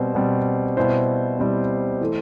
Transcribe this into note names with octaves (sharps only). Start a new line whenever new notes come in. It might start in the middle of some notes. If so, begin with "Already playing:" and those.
Already playing: B2 G3 C4 C5
B2 G3 C4
B2 G3 C4 E4 C5
B2 G3 C4 E4
E3 A3